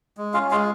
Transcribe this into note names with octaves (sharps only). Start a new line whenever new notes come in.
G#3
C#4 F4 F5
G#3 F4 F5